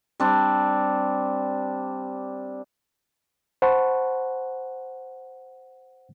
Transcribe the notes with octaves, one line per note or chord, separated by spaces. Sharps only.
G3 C4 D4
C5 F#5 A5 B5 C#6